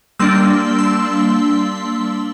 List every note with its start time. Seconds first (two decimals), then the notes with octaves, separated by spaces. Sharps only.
0.20 G3 A#3 D4 C6 E6
0.79 C6 E6